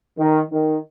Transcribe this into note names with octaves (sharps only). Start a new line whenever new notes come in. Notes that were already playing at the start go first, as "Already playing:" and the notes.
D#3
D#3